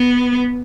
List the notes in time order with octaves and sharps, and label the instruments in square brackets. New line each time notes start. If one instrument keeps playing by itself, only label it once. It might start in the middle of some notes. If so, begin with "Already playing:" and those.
Already playing: [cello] B3